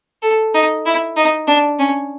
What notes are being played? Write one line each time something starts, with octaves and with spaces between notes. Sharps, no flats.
A4
D#4
E4
D#4
D4
C#4